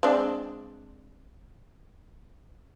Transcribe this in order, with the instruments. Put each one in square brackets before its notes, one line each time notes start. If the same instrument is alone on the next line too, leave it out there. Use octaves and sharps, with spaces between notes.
[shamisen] G#3 C4 D4